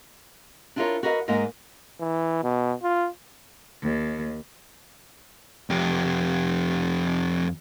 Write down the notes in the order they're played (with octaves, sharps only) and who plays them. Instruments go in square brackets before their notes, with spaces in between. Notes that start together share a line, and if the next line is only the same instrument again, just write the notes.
[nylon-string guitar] D4 E4 F4 G4 A#4 C#5
F#4 A#4 B4 D#5 F5
G#2 A#3 D#5 F5 G#5
[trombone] E3
B2
F4
[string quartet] D#2
[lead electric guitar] F2 G4